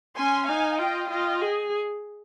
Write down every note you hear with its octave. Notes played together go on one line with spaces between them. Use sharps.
C#4 G#5 C6
D#4 F5 G#5
F4 D#5 G5
F4 D#5 G5
G#4